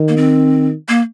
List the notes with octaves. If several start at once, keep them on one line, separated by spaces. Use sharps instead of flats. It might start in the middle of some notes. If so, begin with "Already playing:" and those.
Already playing: D#3
A#3
C4
A#3